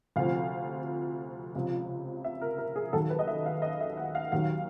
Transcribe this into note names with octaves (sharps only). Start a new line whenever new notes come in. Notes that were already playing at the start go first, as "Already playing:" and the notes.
D2 C3 F3 F5
C#2 C3 F3
E5
A#4
A#4
G#4
D#2 D#3 F#3 A4
B4
D#5
E5
F5
D#5
E5
F#5
F5
D#2 D#3 F#3 F5